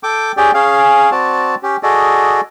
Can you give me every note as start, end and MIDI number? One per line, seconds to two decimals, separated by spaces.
0.03 0.32 69
0.03 0.32 79
0.03 0.32 86
0.37 0.51 61
0.37 0.51 67
0.37 0.51 68
0.37 0.51 74
0.37 0.51 79
0.54 1.10 61
0.54 1.10 68
0.54 1.10 77
1.11 1.55 60
1.11 1.55 66
1.11 1.55 74
1.11 1.55 81
1.63 1.77 61
1.63 1.77 67
1.83 2.41 66
1.83 2.41 68
1.83 2.41 69
1.83 2.41 74
1.83 2.41 75